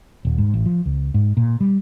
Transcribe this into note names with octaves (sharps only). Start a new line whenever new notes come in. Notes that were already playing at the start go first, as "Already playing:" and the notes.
D#1
G#2
A1
F3
C#2
G#2
A#2
G3